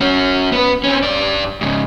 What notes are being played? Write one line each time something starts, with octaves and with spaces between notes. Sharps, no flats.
C#4 F#4
B3 B4
C4 C#4
G2 D5
G#2 C#3